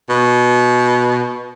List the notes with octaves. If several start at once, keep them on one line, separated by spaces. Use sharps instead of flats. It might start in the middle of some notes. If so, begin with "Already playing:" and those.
B2